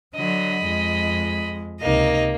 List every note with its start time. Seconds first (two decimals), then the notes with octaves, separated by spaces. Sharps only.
0.15 D3 F#3 D#5 B5
0.66 F2 G#3
1.81 C#2 C3 A#3 D#4 D#5